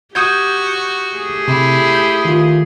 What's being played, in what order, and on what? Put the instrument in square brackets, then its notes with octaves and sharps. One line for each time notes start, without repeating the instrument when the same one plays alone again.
[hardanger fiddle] F#4 [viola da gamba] G4 [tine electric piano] D#6 G6 G#6
[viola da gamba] A3 G4 G#4
[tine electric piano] C3 [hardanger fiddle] E4
[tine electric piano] G6
D#3 F4